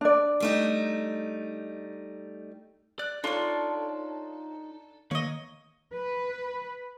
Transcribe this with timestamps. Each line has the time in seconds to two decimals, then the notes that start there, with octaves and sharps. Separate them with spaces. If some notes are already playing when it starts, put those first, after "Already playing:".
0.01 D4 D5
0.40 G3 A3 D#4
2.99 D5 F#6
3.24 D4 D#4 F4 A4 C#5 C6
5.11 D#3 A#3 C#5 D#5
5.93 B4